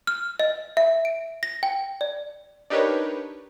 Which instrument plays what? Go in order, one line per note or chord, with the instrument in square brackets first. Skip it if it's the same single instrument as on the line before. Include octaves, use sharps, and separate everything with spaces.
[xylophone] F6
D#5
E5
D7
A#6
G5
D5
[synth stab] D4 D#4 G4 A#4 B4 C#5